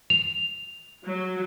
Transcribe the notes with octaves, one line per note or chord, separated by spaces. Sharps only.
F7
F#3